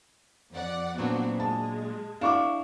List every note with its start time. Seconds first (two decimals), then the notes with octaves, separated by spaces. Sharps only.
0.52 F2 D5 F#5
0.98 A#2 F#3 B3 C4 D4 F#4
1.40 G#3 A5
2.21 D4 E4 F5 C#6 D6